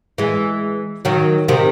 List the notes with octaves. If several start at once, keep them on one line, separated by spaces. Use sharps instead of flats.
E3 G#3
D#3 F#3
C3 D#3